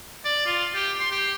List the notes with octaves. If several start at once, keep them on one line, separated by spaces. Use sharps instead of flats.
D5
F4
G4
C6
G4